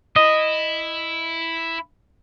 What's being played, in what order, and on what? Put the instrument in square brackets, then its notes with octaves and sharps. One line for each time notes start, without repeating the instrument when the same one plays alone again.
[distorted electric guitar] E4 [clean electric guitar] D#5